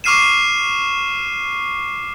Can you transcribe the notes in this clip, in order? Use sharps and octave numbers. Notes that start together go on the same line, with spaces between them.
C#6 D6 F6 C7 D#7 E7